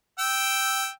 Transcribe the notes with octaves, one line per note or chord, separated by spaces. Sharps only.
G5 E6